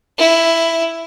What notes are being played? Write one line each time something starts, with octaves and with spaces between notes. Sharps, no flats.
E4